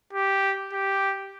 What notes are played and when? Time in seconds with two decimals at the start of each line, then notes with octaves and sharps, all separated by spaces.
0.13 G4
0.73 G4